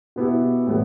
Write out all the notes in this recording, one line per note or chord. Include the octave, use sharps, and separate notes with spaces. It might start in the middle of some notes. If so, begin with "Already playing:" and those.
B2 B3 E4 G4
A2 E3 G3 B3